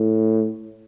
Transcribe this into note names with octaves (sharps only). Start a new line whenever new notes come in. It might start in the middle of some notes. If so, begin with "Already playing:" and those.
Already playing: A2